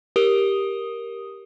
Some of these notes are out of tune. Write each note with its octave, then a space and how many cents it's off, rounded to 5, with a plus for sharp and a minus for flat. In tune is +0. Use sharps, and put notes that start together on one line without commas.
G4 +0 A#4 +5 D#6 +0